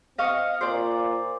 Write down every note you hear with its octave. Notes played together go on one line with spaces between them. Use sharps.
C4 D#5 F5 C#6
A#2 C5 D5